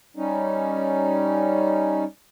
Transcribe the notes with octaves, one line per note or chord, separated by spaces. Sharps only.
G3 C#4 D#4